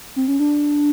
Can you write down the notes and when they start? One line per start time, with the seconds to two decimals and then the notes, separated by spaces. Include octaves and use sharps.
0.16 C4
0.28 C#4
0.39 D4